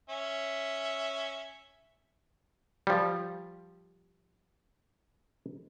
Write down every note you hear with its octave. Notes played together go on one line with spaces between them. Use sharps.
C#4 E5
F3 G3